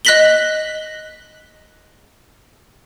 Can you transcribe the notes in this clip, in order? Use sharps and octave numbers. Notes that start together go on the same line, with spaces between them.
D#5 F#6 A#6 B6 F#7 G7